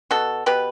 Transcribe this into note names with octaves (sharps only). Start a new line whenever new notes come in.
B2 F#4 A4
B2 G4 B4